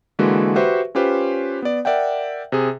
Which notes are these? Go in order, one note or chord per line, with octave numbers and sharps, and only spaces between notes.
D3 E3 G#3 A#3 F#4 B4
F#4 G4 B4 C5 E5 C#6
C#4 F4 G4 B4 C5
B3 D5
A#4 D5 E5 F#5 G5
C3 G#4